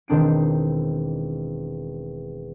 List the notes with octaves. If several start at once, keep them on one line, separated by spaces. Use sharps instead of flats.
E1 D#3 C4 D4 C7 D7